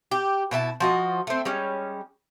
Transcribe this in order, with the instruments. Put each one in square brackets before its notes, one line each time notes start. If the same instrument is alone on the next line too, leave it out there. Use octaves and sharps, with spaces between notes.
[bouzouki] G4
B2 E4 G4 A5
F3 F#4 D#5
A3 C4
G3 G#3 C#4